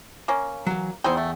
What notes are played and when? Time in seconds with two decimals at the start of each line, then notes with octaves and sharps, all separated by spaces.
0.28 A#3 C#4
0.67 E3 F#3
1.04 E2 D#4 E4 C5 G5
1.17 A3